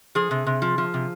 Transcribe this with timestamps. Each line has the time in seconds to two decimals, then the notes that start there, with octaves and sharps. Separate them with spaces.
0.15 F3 G#4
0.31 C3
0.47 C3
0.62 F3
0.78 F3
0.94 C3